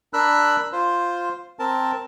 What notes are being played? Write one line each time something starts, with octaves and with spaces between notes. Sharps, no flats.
D4 A#4 B5 E6 F#6
F4 C5
C4 A#4 A5